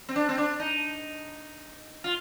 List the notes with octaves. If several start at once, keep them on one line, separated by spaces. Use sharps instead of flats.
C4
D4
C4
D4
D#4
F4